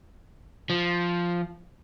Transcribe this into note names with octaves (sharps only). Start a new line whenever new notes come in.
F3